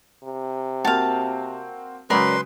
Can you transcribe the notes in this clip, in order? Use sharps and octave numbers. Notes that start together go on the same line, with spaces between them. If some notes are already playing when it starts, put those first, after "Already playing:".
C3
A#3 C4 F#4 F5 A5
C#3 F#3 G#3 A#4 B4 D5 B5 C6